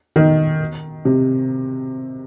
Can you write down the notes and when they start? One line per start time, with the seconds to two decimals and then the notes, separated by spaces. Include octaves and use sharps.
0.16 D#3
1.05 C3